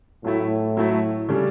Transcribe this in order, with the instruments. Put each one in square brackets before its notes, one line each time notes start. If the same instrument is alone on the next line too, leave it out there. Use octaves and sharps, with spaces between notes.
[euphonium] A2 [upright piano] F#3 A3 E4
[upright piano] F#3 A3 E4
C#3 G3 D4 A4